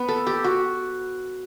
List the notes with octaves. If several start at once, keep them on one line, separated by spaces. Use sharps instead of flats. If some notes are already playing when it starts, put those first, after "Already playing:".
Already playing: B3
A4
G4
F#4